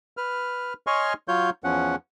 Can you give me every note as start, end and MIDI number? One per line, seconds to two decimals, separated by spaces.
0.17 0.74 71
0.17 0.74 89
0.87 1.13 73
0.87 1.13 75
0.87 1.13 80
0.87 1.13 84
0.87 1.13 85
0.87 1.13 89
1.28 1.50 54
1.28 1.50 65
1.28 1.50 73
1.28 1.50 91
1.64 1.96 40
1.64 1.96 53
1.64 1.96 61
1.64 1.96 78